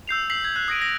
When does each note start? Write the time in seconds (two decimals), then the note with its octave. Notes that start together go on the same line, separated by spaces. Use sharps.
0.08 E6 G6 C7 F7
0.30 E6 B6 C7 F#7
0.45 G#6
0.56 F#6 G6
0.68 D#6 G#6 A#6 C7 D7 D#7
0.80 G#6 A#6